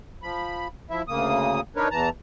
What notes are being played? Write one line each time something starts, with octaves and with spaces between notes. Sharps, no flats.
F3 B5
F3 E4 E5
D2 C#3 A#3 D#6
D4 D#4 A#4 B4 C#5
E2 E3 A5 A#5